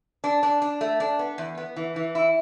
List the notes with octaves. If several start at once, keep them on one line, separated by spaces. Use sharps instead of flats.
D4
D4
D4
A3
D4
B3
E2
B3
E3
E3
E4